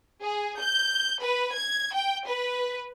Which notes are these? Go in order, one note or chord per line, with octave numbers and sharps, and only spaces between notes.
G#4
G6
B4
G#6
G5
B4